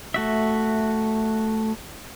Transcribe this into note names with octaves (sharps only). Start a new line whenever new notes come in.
A3 F#4 E5